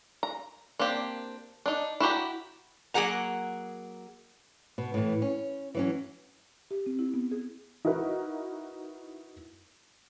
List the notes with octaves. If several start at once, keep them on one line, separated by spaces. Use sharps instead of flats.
A#5
A#3 C4 D4 G4
D4 D#4
E4 F#4 G4 A#5
F#3 A#3 G#4 F#5 A#5
B2
A2 E3
C#4
E3 F#3 C#4
G4
C4
E4
B3
G#4
D#4 E4 F#4 A#4 B4